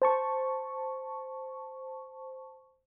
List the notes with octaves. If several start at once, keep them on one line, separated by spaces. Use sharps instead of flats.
C5 A5 C#6